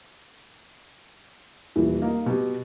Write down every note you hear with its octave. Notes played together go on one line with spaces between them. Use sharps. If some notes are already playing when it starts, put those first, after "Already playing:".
D#1 E3
A#3 D#4
B2 G4